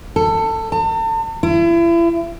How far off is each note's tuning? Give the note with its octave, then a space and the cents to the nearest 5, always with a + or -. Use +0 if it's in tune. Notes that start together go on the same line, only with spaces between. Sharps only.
A4 +20
A5 +40
E4 +35